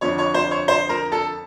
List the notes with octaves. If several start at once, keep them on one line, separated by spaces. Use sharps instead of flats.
F2 D3 F3 C#5 C#6
C#5 C#6
C5 C6
C#5 C#6
C5 C6
A#4 A#5
A4 A5